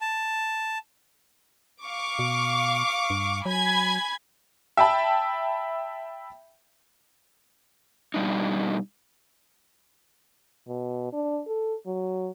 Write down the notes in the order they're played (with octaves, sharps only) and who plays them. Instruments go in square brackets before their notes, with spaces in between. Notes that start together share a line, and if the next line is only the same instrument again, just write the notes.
[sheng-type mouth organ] A5
[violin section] F5 C#6 D6
[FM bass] B2
G2
[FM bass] F#3 [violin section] G#5 B5 G#6
[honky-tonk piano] E5 G5 A5 B5
[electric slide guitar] B2 G3 D4 D#4
[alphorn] B2
D4
A4
F#3